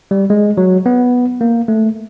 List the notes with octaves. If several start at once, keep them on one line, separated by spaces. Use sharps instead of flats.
G3
G#3
F#3
B3
A#3
A3